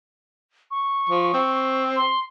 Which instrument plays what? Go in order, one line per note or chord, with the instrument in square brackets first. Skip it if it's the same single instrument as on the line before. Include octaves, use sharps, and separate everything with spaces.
[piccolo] C#6
[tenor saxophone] F3
C4
[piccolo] C6